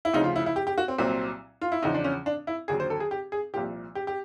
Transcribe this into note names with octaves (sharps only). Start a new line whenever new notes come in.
E4
D2 C#3 F3 D#4
F4
E4
E4
G4
G4
F#4
C4
C2 A#2 F#3 C4
F4
E4
E2 C#3 F3 D#4
D4
C#4
D4
E4
D#2 D3 F#3 G#4
C5
A4
G#4
G4
G#4
C2 A#2 F3 G4
G4
G4